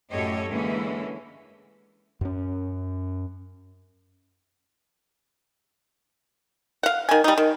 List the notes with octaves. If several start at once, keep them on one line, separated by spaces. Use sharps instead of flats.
F#2 A2 G4 A4 C#5 D#5
D3 E3 G#3 A#3 C#4
F#2 C#4
F5 F#5
D#3 G#5
G3 D#4
D#3